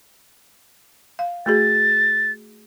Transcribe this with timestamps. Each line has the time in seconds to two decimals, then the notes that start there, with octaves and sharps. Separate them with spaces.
1.19 F5
1.46 A3 F#4 G#4 A6